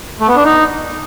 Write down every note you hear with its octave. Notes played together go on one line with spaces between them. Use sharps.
A3
B3
D4
D#4